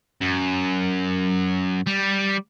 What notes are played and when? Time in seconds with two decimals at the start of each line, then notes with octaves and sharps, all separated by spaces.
0.21 F#2
1.87 G3